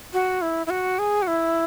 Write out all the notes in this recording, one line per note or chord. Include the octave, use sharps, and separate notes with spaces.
F#4
E4
E4
F#4
G#4
F#4
E4